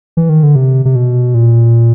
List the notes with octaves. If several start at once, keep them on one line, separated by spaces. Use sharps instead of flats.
E3
D#3
D3
C3
C3
B2
A#2